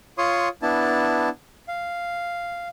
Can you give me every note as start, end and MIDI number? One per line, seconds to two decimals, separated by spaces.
0.18 0.49 65
0.18 0.49 73
0.18 0.49 84
0.18 0.49 85
0.18 0.49 87
0.62 1.29 59
0.62 1.29 62
0.62 1.29 64
0.62 1.29 81
1.68 2.68 77